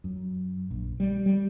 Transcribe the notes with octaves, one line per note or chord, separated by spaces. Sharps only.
F#2
A#1
G3
G3